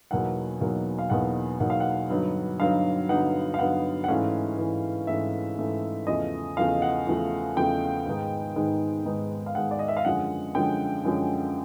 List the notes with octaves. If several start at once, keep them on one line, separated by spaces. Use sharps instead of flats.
E2 B2 F#3 A#3 D#4 F#5
E2 B2 F#3 A#3 D#4
F5
E2 B2 F#3 A#3 D#4 F#5
E2 B2 F#3 A#3 D#4 F#5
F5
F#5
G2 D3 F#3 B3 D#4
G2 D3 F#3 B3 D#4 F5
G2 D3 F#3 B3 D#4 F#5
F5
G2 D3 F#3 B3 D#4 F#5
F#5
G#2 E3 A3 C#4 F5
G#2 E3 A3 C#4
G#2 E3 A3 C#4 E5
G#2 E3 A3 C#4
E2 C#3 F3 A3 D#5
E2 C#3 F3 A3 F5
F#5
E2 C#3 F3 A3
E2 C#3 F3 A3 G5
G#2 D#3 G#3 B3 D#4
G#2 D#3 G#3 B3 D#4
G#2 D#3 G#3 B3 D#4
F5
G#2 D#3 G#3 B3 D#4 F#5
D5
D#5
E5
F5
F#2 D3 F3 G#3 F#5
F#2 D3 F3 G#3 G5
F#2 D3 F3 G#3